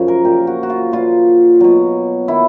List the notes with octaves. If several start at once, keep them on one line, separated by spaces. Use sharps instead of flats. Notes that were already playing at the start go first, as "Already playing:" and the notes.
Already playing: F#2 C#3 F3
A#4
A#2 F3 G4
F#4
F#4
F4
A#2 F3 F4
B2 F#3
D#3 F#3 E4